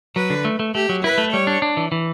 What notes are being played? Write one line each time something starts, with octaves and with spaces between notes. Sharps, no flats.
F#3 B4
D3
A3
A3
A3 G4
F#3
E4 B4
A3
G3 C#5
D4
D4
E3
E3